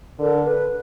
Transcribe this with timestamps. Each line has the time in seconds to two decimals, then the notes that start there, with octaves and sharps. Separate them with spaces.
0.19 D3 A#4
0.45 B4